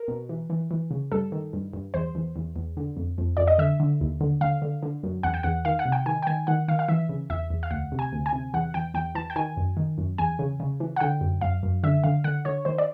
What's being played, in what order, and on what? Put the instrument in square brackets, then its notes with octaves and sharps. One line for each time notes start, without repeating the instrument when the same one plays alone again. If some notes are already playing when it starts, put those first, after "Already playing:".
Already playing: [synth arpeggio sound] A#4
B2
E3
E3
E3
C#3
G2 A4
D#3
G2
G2
E2 C5
E2
E2
E2
D3
F2
F2
F2 D5
D#5
D3 E5
D3
D#2
D3
D3 F5
D3
D3
F#2
E2 F#5
G5
E2 F#5
D#3 F5
F#5
C3
G5
D#3 G#5
G5
D#3 G#5
D#3 F#5
D#3 F5
F5
E3 E5
C#3
E2 E5
E2
F5
D2 F#5
C3
G#5
D2
G#5
C3
E2 F#5
E2 G5
E2 G5
E3 A5
G5
D#3 G#5
F#2
D#3
F#2
E2 G#5
C#3
C#3
E3
F#5
D3 G5
F#2
F#2 F5
F#2
D3 E5
D3 F5
D3 F#5
D3 C#5
D#3 C5
D5